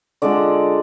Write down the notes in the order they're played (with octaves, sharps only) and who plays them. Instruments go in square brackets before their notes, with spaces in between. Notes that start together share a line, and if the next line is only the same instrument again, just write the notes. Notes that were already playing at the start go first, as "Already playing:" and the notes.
[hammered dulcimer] D3 G#3 D4 F4 D5